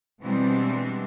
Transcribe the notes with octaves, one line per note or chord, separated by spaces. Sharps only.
B2 E3 G3 G#3 C4 D4